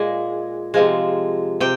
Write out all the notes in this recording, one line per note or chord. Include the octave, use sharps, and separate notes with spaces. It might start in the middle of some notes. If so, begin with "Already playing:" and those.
Already playing: A#2 G#3
C3 F3 G#3
C3 G5